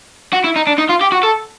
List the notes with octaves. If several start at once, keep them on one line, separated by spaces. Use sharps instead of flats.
F#4
E4
D#4
D4
D#4
F4
G4
F#4
A4